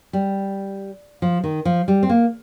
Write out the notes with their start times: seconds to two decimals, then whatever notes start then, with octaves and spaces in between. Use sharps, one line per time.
0.13 G3
1.22 F3
1.44 D#3
1.65 F3
1.88 G3
2.03 C4
2.09 A#3